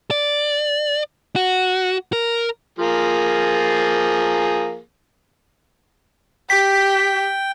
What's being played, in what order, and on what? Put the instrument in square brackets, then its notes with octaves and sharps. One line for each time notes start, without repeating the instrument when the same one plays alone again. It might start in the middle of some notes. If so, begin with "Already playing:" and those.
[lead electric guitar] D5
F#4
A#4
[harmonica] F3 A#3 G#4
[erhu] G4 [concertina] G5 [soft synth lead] B6